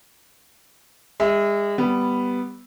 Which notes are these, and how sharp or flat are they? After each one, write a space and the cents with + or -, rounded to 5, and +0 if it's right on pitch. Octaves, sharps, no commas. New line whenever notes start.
G#3 -35 E5 -15
G3 +0 B3 +0